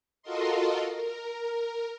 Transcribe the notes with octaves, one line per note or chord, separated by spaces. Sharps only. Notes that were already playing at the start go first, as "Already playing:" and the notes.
F4 F#4 A4 A#4 D#5 C6
A#4